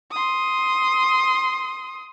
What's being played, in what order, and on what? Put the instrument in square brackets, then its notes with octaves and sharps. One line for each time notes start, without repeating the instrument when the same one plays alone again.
[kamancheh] C6 D#6